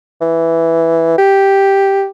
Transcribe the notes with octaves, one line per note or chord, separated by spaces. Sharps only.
E3
G4